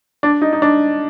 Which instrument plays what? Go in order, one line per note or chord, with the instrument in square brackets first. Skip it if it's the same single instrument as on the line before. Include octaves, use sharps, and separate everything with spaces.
[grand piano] D4
D#4
D#4
D4